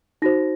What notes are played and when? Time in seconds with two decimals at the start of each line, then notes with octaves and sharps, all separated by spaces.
0.22 D#4 F#4 C5 A#6